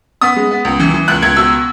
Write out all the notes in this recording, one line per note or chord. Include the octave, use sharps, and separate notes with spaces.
B3 D#6
G#3
B3
C#2
E3
E3
C#2 F#6
C#2 G#6
B2 E6